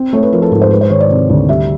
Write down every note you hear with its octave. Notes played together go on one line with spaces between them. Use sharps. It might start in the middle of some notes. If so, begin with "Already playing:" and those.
Already playing: C4
A3 C#5
B4
F3 A#4
A4
G#2 A#4
C5
G#3 B4
C5
D#3 C#5
D5
C3
D2
G3 E5